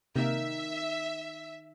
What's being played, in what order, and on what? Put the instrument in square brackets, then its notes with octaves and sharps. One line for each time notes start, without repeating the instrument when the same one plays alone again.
[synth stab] C3 A#3 A#4 [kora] D#3 [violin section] E5